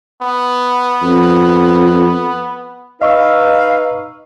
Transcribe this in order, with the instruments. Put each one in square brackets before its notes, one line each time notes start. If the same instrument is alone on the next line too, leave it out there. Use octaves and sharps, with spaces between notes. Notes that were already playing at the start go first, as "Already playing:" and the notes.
[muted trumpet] B3
[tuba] F2
[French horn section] D#4 B4 [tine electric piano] D#5 C#6 E6 [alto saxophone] F5